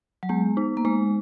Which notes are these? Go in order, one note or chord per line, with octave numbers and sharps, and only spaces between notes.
F#3
G#3 B3
D#4
A#3
G#3 D#4